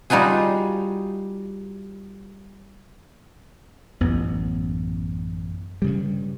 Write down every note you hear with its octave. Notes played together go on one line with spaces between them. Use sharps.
G3 D#4 F4 F#4 G#4
A1 F#2 B3
G2 C#3 G3